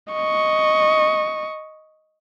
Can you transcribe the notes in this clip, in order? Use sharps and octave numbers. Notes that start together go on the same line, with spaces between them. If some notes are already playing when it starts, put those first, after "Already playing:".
D#5 C#6